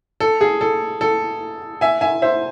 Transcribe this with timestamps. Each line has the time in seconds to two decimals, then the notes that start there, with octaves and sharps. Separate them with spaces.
0.20 A4
0.41 G#4
0.61 A4
1.01 A4
1.81 E5 G#5
2.01 E5 G#5
2.22 C5 E5